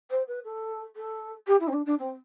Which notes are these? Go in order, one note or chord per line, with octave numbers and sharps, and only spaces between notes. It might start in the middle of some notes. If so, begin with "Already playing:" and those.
C5
B4
A4
A4
G4
E4
C4
D4
D4
C4